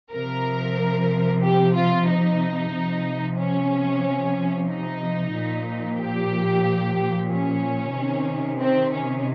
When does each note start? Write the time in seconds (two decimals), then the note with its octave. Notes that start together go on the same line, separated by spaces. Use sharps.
0.12 C3 F3 A#4
1.43 G4
1.75 F4
2.09 D#4
2.73 C3 F3
3.38 C#4
4.69 D#4
5.35 A#2 F3
5.99 G4
7.30 C#4
7.95 C3 D#3
8.61 C4
8.93 C#4